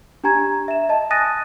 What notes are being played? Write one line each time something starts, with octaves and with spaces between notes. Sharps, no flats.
D4 G4 G#5 A#5 G#6
E5 E7
D#5 A5
G#5 D#6 F#6 A6 A#6 D#7